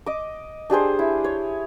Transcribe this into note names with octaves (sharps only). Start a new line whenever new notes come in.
D#5 D6
D4 G4 G#4 C5
E4
C#5